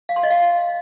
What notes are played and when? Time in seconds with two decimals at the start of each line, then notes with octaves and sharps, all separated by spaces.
0.09 F5
0.16 C6
0.23 D#5
0.30 F5